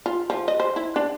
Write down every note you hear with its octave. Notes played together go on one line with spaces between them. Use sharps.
F4
F3
D#5
C5
E4
D4